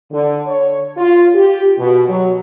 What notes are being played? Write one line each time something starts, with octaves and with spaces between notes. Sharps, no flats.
D3
C#5
F4
G4
B2
F#3